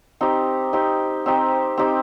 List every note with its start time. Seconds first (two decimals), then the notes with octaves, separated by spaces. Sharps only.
0.21 C4 D#4 G4
0.73 C4 D#4 G4
1.26 C4 D#4 G4
1.77 C4 D#4 G4